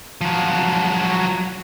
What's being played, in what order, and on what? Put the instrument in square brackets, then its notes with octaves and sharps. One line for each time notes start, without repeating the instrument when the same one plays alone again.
[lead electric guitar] F3 F#3